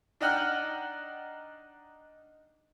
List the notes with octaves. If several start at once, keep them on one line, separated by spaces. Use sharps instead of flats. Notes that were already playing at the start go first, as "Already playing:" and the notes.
D4 D#4 F#5 G5 F6